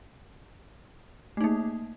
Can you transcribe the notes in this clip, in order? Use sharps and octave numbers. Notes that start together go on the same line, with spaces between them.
A3 A#3 D#4